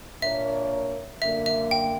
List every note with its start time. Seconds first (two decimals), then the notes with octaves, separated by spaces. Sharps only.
0.22 A#2 A#3 D4 A#4 C#5 E5
1.21 F#2 D3 A#3 E5
1.46 E5
1.71 G5